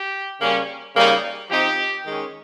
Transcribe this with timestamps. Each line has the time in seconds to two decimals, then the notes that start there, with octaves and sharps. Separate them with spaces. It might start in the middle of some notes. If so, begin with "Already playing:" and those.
Already playing: G4
0.41 C#3 G3 A#3 C#4
0.95 C#3 G3 A#3 D#4
1.50 F3 C4 D#4 G4
2.05 D#3 G#3 C#4